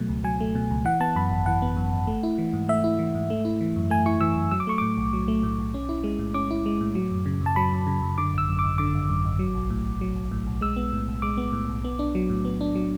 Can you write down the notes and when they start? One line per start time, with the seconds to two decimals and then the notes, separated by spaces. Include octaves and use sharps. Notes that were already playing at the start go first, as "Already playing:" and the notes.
Already playing: B2 F#3 A3
0.09 C#2
0.24 F#3 G#5
0.40 A3
0.55 B2
0.71 C#2
0.85 E3 F#5
1.00 B3 A5
1.16 F#2 B5
1.31 G#1
1.46 E3 F#5
1.62 B3
1.77 F#2
1.93 G#1
2.07 A3
2.23 E4
2.38 E3
2.53 G#2
2.69 A3 E5
2.84 E4
2.99 E3
3.15 G#2
3.30 A3
3.45 E4
3.61 E3
3.76 F#2
3.90 A3 G#5
4.06 E4 C#6
4.21 E3 E6
4.36 F#2
4.51 F#3 E6
4.60 D6
4.67 A3 C#6
4.78 A2 D6
4.97 B1
5.13 F#3
5.28 A3
5.43 A2
5.59 B1
5.74 C#4
5.89 E4
6.04 G#3
6.19 A2
6.34 C#4 D6
6.51 E4
6.66 G#3
6.81 A2
6.95 F#3
7.12 F#2
7.26 C#3
7.41 F#2
7.46 A5
7.56 F#3 B5
7.72 F#2
7.87 C#3
8.02 F#2
8.18 D3 D6
8.34 G#1 E6
8.49 F#2
8.59 G#1 D6
8.78 D3 D6
8.94 G#1
9.09 F#2
9.25 G#1
9.39 F#3
9.55 B1
9.70 A2
9.85 B1
10.01 F#3
10.16 B1
10.31 A2
10.47 B1
10.61 G#3 E6
10.76 B3
10.93 A2
11.08 B1
11.22 G#3 D6
11.37 B3
11.53 A2
11.69 B1
11.84 B3
11.99 D4
12.15 F#3
12.30 A2
12.45 B3
12.61 D4
12.75 F#3